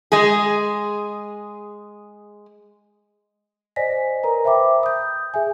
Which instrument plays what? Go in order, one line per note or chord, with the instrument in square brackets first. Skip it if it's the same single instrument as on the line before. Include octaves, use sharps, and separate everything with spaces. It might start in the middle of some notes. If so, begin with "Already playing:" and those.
[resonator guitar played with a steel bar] G#3 G#4
[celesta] C5 D5 D#5 G#5 A#6 B6
A#4 B4 A#5
C5 E5 G5 B5 D6
D#6 G6
G#4 E5 G#5